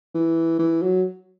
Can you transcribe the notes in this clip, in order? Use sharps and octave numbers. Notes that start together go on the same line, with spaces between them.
E3
E3
F#3